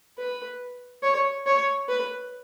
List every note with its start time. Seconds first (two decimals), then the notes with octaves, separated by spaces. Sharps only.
0.18 B4
1.03 C#5
1.46 C#5
1.89 B4